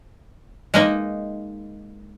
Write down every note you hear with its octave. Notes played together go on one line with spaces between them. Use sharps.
G#3 A#3 D#4